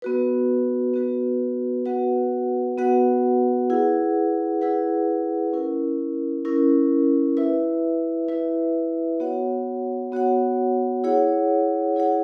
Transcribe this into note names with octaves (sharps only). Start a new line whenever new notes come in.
B3 F#4 B4
B3 F#4 B4
B3 F#4 B4 F#5
B3 F#4 B4 F#5
E4 G#4 B4 F#5
E4 G#4 B4 F#5
C#4 E4 A#4
C#4 E4 A#4
E4 B4 E5
E4 B4 E5
B3 F#4 C#5 F#5
B3 F#4 C#5 F#5
E4 G#4 C#5 F#5
E4 G#4 C#5 F#5